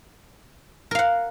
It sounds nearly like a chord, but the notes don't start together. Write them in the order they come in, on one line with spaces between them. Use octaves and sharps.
A#4 F5 F#5